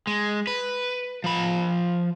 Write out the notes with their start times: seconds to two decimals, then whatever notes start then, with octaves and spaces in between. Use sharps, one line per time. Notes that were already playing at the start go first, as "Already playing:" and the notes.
0.07 G#3
0.47 B4
1.24 F3 B5